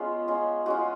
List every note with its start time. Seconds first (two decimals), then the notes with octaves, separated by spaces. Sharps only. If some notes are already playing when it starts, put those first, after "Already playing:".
Already playing: G#3 B3 C#4 F4
0.28 G#3 C#4 F4
0.66 G#3 C#4 F4 F#4